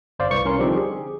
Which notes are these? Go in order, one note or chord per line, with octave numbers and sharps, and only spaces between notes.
G1 C5 D5 F5
C2 B4 C#6 C#7
C2 C#4 A#4 C6
D3 F3 G3 C4 D#4 G4
G#4